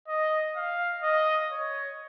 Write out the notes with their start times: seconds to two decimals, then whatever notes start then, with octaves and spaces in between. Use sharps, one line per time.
0.08 D#5
0.56 F5
1.03 D#5
1.51 C#5